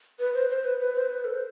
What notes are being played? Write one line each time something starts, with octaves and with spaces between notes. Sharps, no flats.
B4
C5
C5
B4
B4
C5
B4
A4
C5